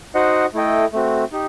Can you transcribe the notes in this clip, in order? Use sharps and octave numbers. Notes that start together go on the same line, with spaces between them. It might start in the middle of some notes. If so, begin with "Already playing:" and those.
D#4 F#4 C5 D#5 F#5
A3 E4 A4 D#5 G5
A3 C4 F#4
D#4 G4